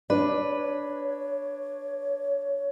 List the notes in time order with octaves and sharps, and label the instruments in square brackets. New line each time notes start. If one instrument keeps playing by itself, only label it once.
[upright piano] D4 [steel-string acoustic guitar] B4 [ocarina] C#5